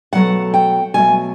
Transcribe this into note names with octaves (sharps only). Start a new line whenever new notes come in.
B2 F#3 A3 F#5
G5
B2 F#3 A3 G#5